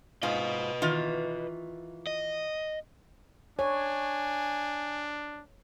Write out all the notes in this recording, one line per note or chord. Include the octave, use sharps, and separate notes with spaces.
G#2 F4 B4 D#5
D#3 E3 F4
D#5
D4 C#5 G#5